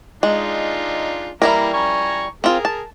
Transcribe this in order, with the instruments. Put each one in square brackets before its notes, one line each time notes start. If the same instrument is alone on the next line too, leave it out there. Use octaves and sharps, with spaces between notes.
[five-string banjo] G#3 [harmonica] D4 D#4 F4
[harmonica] E3 A#3 A#5 [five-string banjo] G3 E4 A#4
[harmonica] G#5 A#5 C#6
[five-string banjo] C4 F4 [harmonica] G#4 A#4
[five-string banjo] A5